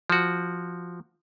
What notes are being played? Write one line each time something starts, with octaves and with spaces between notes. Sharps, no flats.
F3 F#4